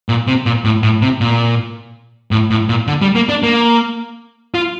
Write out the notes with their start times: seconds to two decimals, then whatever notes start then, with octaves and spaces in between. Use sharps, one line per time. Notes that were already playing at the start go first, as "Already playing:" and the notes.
0.09 A#2
0.27 C3
0.46 A#2
0.64 A2
0.83 A2
1.02 C3
1.21 A#2
2.31 A2
2.50 A2
2.69 A#2
2.87 D3
3.02 G3
3.15 A#3
3.29 D4
3.43 A#3
4.54 F4